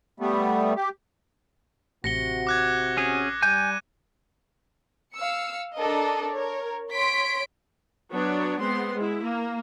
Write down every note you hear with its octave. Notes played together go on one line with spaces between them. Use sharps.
G3 A3 B3
G4
A1 C3 F#4 A#6 C#7 G7
D6 F#6 G#6
C#4 G#4
G3 G#5 G6 D#7
F5 E6 C#7
D4 A4 A#4 D#5
A#4 C#5
C#5 C6 B6 D7
F#3 B3 D4 C#5
G#3 B3 C4 C6
G#3 E4
A#3